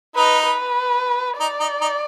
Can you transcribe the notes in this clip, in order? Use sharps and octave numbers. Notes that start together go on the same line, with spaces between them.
D#4 B4
B4
D#4 D5
D#4
D#4